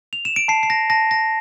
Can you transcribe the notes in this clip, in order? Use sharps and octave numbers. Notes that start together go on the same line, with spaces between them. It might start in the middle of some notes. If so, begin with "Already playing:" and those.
F7
E7
D7
A5 C7
C7
A#6
A5 A#6
A#6